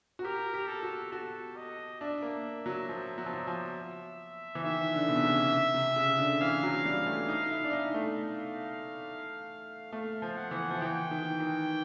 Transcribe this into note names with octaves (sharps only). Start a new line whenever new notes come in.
F#4
G4 A#4
G4
A4
F#4
F#4 A4
D#5
D4 E5
A#3
F#3
F3
F#3
F3
F#3
F3
E3
D#3 E5
D3
B2
C3
C#3
C3
C#3
D3
E3 F5
F#3
G3
A3
D#4
E4
D4
D#4
A3
F5
A3 F5
F3
F#5
E3
F3
E3 G5
D#3
D#3